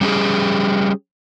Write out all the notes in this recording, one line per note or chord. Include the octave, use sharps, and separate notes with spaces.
G3 C#4 G4 G#4